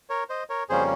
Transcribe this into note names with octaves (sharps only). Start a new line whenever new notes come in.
A#4 C#5
C5 D#5
A#4 C#5
F2 C#3 G3 A#3 C#4 G#4 C5